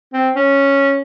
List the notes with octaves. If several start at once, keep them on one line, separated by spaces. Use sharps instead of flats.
C4
C#4